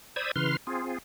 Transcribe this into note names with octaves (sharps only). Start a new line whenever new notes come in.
C5 D5 B5 D#6 E6 G#6
C#3 E3 B4 C6 F6
C4 F4 G#4